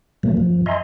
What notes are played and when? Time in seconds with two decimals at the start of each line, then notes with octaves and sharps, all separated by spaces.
0.23 B2 E3 F#3 A3 A#3
0.37 F#2 F3
0.66 D#5 E5 G#5 A#5 C6